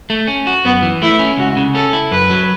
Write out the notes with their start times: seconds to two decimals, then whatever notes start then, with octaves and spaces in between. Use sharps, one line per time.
0.10 A3
0.27 C#4
0.47 F#4
0.65 F#2 B3
0.82 E3
1.02 A3 E4
1.19 C#4
1.38 C#2 F#4
1.57 C#3
1.75 C#4 A4
1.93 E4
2.11 F#2 B4
2.30 F#3